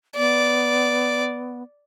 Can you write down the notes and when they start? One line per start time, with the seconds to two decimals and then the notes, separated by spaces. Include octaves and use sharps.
0.16 B3 D5